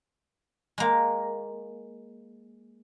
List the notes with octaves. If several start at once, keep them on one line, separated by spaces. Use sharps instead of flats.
G#3 A#3